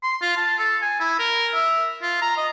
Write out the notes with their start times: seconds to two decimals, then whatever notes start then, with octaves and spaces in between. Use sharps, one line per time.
0.03 C6
0.22 F4
0.37 A5
0.58 A4
0.82 G#5
1.00 E4
1.19 A#4
1.54 E5
2.02 F4
2.22 A#5
2.37 D#5